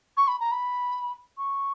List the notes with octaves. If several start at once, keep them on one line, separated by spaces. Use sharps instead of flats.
C#6
B5
A#5
B5
C#6